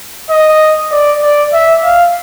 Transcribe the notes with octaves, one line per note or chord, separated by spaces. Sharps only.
D#5
D5
D5
E5
F5